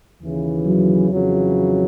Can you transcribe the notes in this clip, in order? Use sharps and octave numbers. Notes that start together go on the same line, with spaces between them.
D#2 C#3 E3
F#3
F2 C#3 E3 F#3